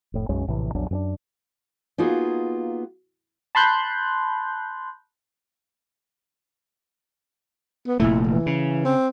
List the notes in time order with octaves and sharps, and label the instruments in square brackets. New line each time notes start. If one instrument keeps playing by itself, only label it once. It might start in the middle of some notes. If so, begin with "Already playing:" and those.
[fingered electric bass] F1 A2
B1 F#2 G#3 C#4
A#1 A2 C3 E3
A#1 E2 F#3 D4
F#2 C4 D4
[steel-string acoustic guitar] A#3 B3 D#4 F4 F#4 G#4
[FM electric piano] A5 B5 C6 F#6 G6
[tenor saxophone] B3
[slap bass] F1 A#2 A3 [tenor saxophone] E4
[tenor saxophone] E3
[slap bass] C#3
[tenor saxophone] C4